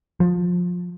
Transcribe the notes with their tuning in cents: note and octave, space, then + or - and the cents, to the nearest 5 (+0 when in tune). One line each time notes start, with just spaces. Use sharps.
F3 +25